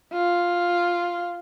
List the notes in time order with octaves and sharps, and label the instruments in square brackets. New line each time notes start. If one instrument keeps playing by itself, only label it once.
[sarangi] F4